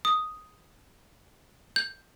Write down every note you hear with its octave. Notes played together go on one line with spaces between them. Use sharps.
D#6
G6